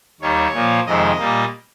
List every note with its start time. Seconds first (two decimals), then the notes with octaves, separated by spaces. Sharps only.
0.21 D#2 D#3 G3 C#5
0.53 A#2 F3 A#3
0.86 F2 C3 D#3 G#3 D#5
1.18 A#2 G3 A#3